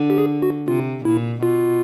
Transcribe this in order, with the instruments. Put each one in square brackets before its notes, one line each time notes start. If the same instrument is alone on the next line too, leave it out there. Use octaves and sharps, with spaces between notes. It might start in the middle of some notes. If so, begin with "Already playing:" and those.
Already playing: [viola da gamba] D3
[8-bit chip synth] G4
G#4
F#4
[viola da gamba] C3 [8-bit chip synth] F4
[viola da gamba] A#2 [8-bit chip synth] E4
[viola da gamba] B2 [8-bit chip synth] F4